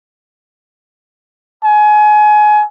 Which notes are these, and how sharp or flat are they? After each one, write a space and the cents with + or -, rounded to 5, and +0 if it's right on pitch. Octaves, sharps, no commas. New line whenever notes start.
G#5 +25